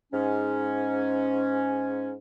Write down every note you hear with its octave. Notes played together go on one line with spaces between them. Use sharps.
G#2 C#4